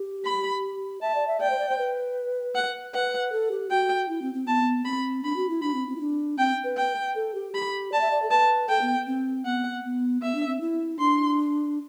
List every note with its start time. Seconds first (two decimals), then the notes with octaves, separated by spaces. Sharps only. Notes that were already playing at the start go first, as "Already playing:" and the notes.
Already playing: G4
0.25 B5
1.01 E5 A5
1.15 D5
1.28 E5
1.40 D5 G5
1.50 C5
1.59 D5
1.69 C5
1.78 B4
2.55 F#5
2.94 B4 F#5
3.32 A4
3.51 G4
3.70 F#4 G5
4.09 E4
4.22 C4
4.34 C4
4.47 B3 A5
4.85 C4 B5
5.24 D4 B5
5.36 F#4
5.49 E4
5.62 D4 B5
5.74 C4
5.88 C4
5.96 E4
6.00 D4
6.38 C4 G5
6.64 B4
6.76 G5
7.15 A4
7.35 G4
7.54 G4 B5
7.92 D5 A5
8.01 E5
8.11 D5
8.23 A4
8.30 B4 A5
8.69 A4 G5
8.82 B3
9.07 C4
9.45 B3 F#5
9.84 B3
10.22 B3 E5
10.35 D4
10.47 C4
10.61 E4
10.99 D4 C6